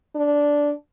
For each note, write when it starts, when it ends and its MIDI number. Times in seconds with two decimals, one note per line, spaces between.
0.15 0.73 62